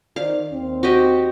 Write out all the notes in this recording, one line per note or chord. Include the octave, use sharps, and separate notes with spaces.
D#3 C5 D5 F5
D#2 C4
F#4 G4 D#5